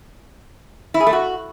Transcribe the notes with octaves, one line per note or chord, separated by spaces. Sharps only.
E4
G#4
A3
F#4